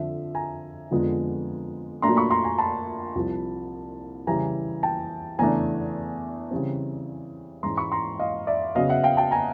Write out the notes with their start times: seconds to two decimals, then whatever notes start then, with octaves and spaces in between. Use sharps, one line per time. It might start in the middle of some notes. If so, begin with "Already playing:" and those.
Already playing: F2 D3 F3 E5
0.35 G#5 A#5
0.91 F2 D3 F3 G#3 B3
2.02 A#2 F#3 A3 D4 A#5 C6
2.17 B5 C#6
2.30 A#5 C6
2.44 G#5 A#5
2.58 A5 B5
3.15 C2 C3 F3
4.27 C#3 E3 G3 G#5 A#5
4.83 G5 A5
5.39 E2 C#3 E3 A3 D4 G#5 A#5
6.51 C#3 E3 G3 C4
7.63 G#2 E3 G#3 C#4 A#5 C6
7.77 B5 C#6
7.92 A#5 C6
8.19 D#5 F5
8.47 D5 E5
8.75 C#3 F#3 B3 D#5 F5
8.89 E5 F#5
9.03 F5 G5
9.17 G5 A5
9.31 G#5 A#5